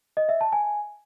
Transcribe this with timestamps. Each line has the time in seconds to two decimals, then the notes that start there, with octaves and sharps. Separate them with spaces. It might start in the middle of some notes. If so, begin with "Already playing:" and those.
0.17 D#5
0.29 E5
0.41 A5
0.53 G#5